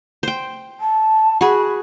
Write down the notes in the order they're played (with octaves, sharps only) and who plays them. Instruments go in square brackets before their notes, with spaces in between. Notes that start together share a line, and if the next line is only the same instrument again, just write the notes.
[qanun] C5 G5
[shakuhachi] A5
[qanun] F#4 G#4 [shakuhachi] B5